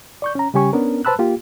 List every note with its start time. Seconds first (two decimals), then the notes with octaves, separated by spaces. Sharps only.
0.22 D5 C#6 G6
0.35 C#4 A#5
0.54 C#3 G3 C#4 G4 G#5 C#6
0.73 B3 C#4 D4 A#4
1.05 B4 C5 A5 B5 E6 F#6
1.19 A#3 F4 G4